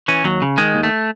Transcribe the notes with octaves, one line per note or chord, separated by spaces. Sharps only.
E3 C#4
D#2 F#3
C#3
D#3 G#3
D#2
A3